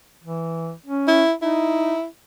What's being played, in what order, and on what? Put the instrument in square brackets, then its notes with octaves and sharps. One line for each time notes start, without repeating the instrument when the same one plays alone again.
[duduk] E3
C#4
[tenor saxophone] E4
[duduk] D#4 [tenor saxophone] E4